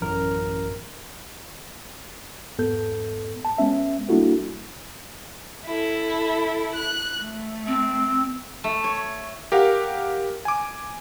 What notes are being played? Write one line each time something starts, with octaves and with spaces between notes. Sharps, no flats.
A1 F#2 A#4
E2 G#2 B3 A4 G6
A5
G#3 B3 C#4 E5
G3 A#3 D4 E4 F#4 A4
E4 A4
F#6
A3
C4
A3
C#5
G4 A#4 F5 F#5
G#5 D6